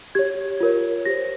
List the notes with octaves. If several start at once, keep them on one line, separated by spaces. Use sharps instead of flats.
G4 C#5 G#6
F4 A#4 C#5
G4 C5 A#6